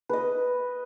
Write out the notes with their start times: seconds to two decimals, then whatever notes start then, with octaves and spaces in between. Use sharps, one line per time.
0.09 B4 D#5